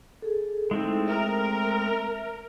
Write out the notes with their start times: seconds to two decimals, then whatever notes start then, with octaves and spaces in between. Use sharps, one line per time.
0.22 G#4 A4
0.71 G#3 A3 C4 D#4 E4 A4
1.08 A#4 E5